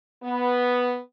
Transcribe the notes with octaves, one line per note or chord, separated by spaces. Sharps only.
B3